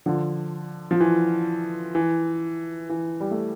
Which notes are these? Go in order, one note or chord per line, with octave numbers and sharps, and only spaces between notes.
D3 F3
F3
E3
E3
E3
G3
A3